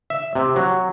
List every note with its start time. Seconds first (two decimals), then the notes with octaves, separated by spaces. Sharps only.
0.10 E5
0.35 C3
0.56 F#3